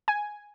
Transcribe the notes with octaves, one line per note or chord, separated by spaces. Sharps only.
G#5